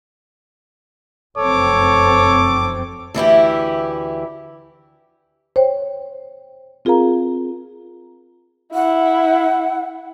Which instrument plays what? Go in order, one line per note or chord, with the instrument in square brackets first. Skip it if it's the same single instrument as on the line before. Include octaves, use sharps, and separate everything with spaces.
[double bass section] F1 F#2 C4 [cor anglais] A4 [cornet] C#5 [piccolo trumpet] D6
[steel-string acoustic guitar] D2 E3 E4 G4
[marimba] C5 C#5 G5
C4 F4 G#4 A#4 F5 A#5
[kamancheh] E4 [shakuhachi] F#5